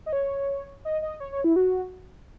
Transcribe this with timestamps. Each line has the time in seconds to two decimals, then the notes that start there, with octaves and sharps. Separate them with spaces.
0.06 D#5
0.13 C#5
0.85 D#5
1.02 D#5
1.20 C#5
1.32 C#5
1.44 E4
1.56 F#4